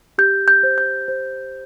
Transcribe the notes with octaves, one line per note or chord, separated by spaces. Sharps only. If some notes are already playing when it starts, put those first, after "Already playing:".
G4 G6
G6
C5
G6
C5